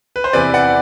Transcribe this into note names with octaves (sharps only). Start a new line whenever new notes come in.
B4
C5
E2 C3 E3 B4 D5
D5 F#5